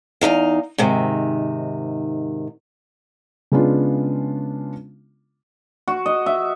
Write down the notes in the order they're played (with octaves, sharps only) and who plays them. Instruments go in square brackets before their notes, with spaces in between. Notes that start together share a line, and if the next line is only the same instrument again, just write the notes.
[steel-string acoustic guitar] E2 C#3 D#4 F5
G#2 C3 D#3
[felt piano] C#3 G#3 B3 C#4 D4 F4
[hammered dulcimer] F#4
D#5
E5